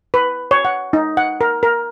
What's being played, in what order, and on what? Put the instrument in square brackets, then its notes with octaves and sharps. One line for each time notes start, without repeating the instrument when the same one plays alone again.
[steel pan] B4
C#5
F#5
D#4
F#5
A#4
A#4